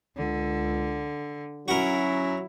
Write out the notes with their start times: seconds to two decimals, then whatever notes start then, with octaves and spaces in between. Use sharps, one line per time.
0.17 C#2 D3
1.68 F#3 C#4 E4 F#4 A#4